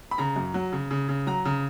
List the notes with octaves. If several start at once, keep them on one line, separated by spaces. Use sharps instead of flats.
B5
C#3 A#5
F#2
F#3
C#3
C#3
C#3
F#3 A#5
C#3